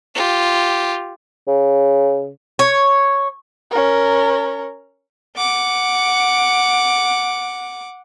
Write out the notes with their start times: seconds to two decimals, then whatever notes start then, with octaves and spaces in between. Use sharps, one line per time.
0.15 F4 G4
1.48 C#3
2.59 C#5
3.71 C#4 A#4
5.36 F#5 D6